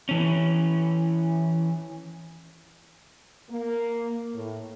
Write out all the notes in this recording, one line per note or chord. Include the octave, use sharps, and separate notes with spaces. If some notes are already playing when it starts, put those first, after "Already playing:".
E3 C#4
A#3
A2